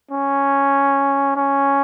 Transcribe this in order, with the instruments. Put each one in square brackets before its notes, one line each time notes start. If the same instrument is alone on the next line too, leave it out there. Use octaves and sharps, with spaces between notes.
[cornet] C#4
C#4